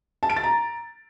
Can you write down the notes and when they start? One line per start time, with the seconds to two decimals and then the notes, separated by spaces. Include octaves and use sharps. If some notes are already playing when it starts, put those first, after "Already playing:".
0.23 A5
0.30 D7
0.36 A6
0.43 A#5